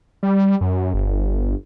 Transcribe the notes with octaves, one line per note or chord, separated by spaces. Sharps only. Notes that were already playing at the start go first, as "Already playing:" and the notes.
G3
F#2
G1